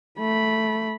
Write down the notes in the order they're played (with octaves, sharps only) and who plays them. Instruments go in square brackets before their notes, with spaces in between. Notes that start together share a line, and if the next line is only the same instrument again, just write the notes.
[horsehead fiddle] A3 B5